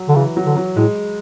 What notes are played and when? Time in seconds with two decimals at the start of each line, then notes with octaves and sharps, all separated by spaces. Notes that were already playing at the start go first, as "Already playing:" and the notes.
Already playing: F#3
0.09 D3
0.15 C#3 E3
0.37 F#3
0.46 D3
0.57 F#3
0.76 A2 G#3